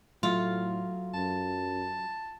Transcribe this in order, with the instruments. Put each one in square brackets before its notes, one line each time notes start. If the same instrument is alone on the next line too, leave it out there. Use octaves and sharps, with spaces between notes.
[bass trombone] A2 [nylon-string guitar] F#3 A3 [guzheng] F4
[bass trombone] F#2 [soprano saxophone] A5